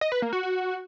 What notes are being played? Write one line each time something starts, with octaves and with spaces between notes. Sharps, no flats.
D#5
B4
A#3
F#4
F#4